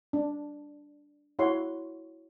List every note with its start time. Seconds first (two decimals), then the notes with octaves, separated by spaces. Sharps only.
0.13 D4
1.39 E4 F#4 C#5 F#5 C6